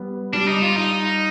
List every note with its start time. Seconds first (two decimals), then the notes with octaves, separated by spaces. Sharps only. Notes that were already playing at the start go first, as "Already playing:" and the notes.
Already playing: G3 B3
0.33 G3 D4
0.48 D#4
0.62 F4
0.76 D#4